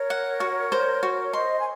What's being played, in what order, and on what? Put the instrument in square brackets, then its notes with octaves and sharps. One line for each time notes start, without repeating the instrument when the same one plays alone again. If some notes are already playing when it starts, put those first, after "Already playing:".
Already playing: [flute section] A#4 C#5
[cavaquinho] F#5
F#4
C5
F#4
[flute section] C#5
[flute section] C5 D#5 [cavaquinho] C6
[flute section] G#5